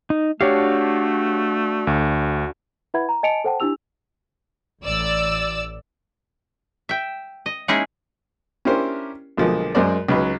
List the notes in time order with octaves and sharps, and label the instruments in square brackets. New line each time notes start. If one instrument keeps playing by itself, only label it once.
[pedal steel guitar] D#4
[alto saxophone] A3 [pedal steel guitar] D4 F#4 F5 [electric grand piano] G4 C#5
[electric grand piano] D2
[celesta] E4 B4 E5 F#5 B5 G#6
A#5
D#5 G#5 A5 C#7 D7 F7
A4 C5 F#5 G5 A5
D4 E4 G4 E6 F7
[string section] A1 D5 E6
[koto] E5 G5
D#5
G#3 A#3 C#4 D#4 E4 G#4
[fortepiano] C#4 D4 E4 G4 A#4 C5
B1 D3 F3 G#3 A#3
F#2 G#3 A#4 C5 D5
C#2 F#3 D#4 B4